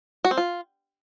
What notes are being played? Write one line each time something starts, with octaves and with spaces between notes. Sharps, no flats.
F#4
C4
F4